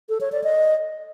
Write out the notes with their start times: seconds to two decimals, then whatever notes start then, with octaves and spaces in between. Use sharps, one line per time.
0.09 A4
0.21 C#5
0.32 D5
0.44 D#5